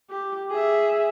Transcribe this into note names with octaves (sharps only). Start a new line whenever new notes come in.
G4
G#4 E5